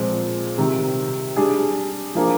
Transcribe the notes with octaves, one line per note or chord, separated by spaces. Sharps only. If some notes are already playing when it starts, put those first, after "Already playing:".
Already playing: A#2 F3 G#3 C4
C3 D#3 G3
G3 D4 G#4
F3 A#3 D4 G#4